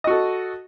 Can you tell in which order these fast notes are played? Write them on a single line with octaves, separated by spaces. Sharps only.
D#5 F#4 A4